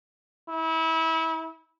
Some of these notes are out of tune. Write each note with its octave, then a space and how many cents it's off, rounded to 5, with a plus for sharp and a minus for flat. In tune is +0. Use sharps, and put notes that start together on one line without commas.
E4 -30